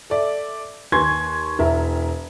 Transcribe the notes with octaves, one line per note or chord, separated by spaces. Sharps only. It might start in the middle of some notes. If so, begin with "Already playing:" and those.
A4 D5 E5
D#2 B4 G#5 C6 C#6 G#6
E1 E4 A#4 E5